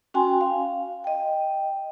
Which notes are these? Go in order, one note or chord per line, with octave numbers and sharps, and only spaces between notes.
C#4 F#4 G5 G#5 C6
F5
D#5 G5